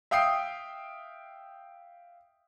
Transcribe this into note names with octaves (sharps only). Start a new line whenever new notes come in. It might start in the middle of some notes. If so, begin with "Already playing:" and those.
E5 F5 G5 D#6 G6 C7